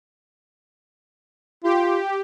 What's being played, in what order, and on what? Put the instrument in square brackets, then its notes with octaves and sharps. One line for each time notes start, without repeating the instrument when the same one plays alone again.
[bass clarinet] F4 [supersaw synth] G4